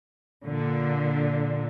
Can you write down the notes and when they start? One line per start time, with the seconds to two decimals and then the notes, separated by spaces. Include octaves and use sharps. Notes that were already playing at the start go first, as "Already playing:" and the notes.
0.46 A#2 D3